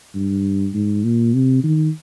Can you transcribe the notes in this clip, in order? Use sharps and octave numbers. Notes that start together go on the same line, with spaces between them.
G2
G#2
A#2
C3
D#3